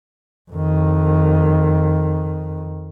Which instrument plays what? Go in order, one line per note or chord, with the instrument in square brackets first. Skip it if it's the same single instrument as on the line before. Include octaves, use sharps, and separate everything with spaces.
[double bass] F2 D#3